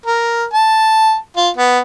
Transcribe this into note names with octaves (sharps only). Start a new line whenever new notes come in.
A#4
A5
F4
B3